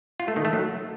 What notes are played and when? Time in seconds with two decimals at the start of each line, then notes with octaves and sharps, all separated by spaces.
0.20 F4
0.28 A3
0.36 D#3
0.45 A3
0.53 F#3